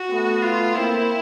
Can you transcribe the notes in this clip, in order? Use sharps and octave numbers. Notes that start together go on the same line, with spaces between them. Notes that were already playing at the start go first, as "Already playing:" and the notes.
Already playing: F#4
A3 B3
F4
A#3 C4 E4